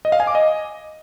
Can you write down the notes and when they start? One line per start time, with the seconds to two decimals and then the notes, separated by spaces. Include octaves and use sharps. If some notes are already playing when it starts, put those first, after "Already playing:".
0.05 D#5
0.12 F5
0.20 G#5
0.27 D6
0.35 D#5